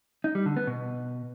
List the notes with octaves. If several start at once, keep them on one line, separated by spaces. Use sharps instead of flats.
D#4
G3
D3
B3
B2